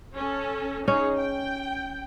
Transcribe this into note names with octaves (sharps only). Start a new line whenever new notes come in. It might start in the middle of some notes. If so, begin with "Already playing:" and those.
C#4 A4
C#4 D#4 G#4 C#5
G5